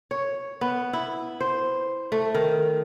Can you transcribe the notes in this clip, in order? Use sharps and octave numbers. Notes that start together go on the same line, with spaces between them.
C#5
B3
E4
C5
A3
D#3